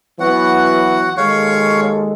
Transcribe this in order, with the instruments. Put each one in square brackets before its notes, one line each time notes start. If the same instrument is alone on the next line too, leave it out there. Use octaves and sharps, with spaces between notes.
[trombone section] E3 F#3 B3 [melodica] F#4 F#5
[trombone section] D#2 G#3 A4 [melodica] C#5 F5 C#6